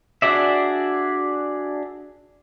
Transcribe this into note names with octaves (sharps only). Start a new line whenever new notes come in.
D4 F#4 G#4 D5 E5